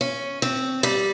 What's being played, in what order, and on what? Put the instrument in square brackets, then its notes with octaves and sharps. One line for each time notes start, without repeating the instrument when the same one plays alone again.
[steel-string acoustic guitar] C#4
C4
G3